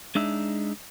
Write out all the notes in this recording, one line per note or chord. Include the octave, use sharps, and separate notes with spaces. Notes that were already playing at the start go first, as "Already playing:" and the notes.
G#3 D4 D#4 E5